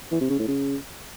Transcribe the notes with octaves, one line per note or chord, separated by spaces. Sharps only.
E3
C3
C#3
A2
C#3